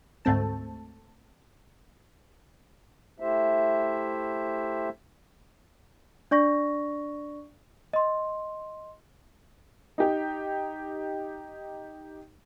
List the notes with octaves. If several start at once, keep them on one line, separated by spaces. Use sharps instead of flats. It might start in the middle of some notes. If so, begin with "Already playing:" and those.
D2 G#2 A3 C4 A5
A3 E4 G4 C5 E5
D4 D5 C#6 A#6
D#5 C6
D#4 G4